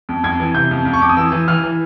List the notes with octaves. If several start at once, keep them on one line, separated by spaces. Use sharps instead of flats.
F2
F2 G#6
E3
C3 G6
F2
F2
C#6
F2 D6
D#6
E3 E6
E3
E3 F6
E3